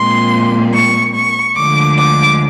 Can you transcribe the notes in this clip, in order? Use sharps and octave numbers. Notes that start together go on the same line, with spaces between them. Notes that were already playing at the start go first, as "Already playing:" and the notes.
Already playing: A#2 F3 G#3 C4 C6
C#6
C#6
D2 D3 F3 G#3 D6
D6